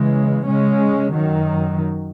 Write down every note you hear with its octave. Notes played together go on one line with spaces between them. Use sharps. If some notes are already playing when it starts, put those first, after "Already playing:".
Already playing: C#3 E3 G#3
C#3 G#3 C#4
F#2 D#3 F#3